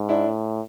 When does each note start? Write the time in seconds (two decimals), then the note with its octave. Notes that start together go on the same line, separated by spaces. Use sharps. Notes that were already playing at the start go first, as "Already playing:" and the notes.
Already playing: G#2
0.09 D4 E4
0.25 A2